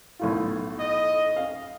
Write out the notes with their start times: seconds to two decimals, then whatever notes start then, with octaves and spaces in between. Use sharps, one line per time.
0.19 B1 A2 F4
0.79 D#5
1.36 F5